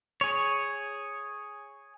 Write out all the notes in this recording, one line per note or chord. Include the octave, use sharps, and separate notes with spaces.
G#4 C#5